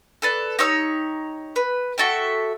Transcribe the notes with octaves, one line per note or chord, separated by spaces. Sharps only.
A4 B4 D5
D#4 G4 C#5 E6
B4
F#4 A4 E5 G5